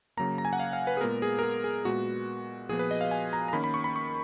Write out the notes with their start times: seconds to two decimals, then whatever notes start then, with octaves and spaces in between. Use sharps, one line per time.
0.17 C#3 F#3 A#3 A#5
0.38 A#5
0.45 G#5
0.53 F#5
0.60 F5
0.73 F5
0.87 B4
0.97 G#4
1.01 A#2 G#3 B3 A#4
1.22 G#4
1.39 A#4
1.43 G#4
1.64 G#4
1.85 A#2 G#3 B3 F#4
2.69 A#2 F3 B3 G#4
2.79 B4
2.91 D#5
3.01 F5
3.11 G#5
3.33 A#5
3.48 A#5
3.53 D#3 A#3 C#4 B5
3.64 B5
3.74 C#6
3.84 B5
3.96 C#6